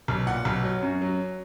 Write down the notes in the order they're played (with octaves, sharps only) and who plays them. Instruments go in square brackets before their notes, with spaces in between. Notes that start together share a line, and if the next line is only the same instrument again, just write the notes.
[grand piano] B1
A#2 F#5
B1
F#3
F#2
F#3